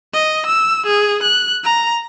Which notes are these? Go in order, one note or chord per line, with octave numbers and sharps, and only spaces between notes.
D#5
E6
G#4
F#6
A#5